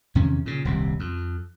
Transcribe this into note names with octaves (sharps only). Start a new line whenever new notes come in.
E2 C3 D#3 C#4
A#2 C#3
D#1 C2 C3
F2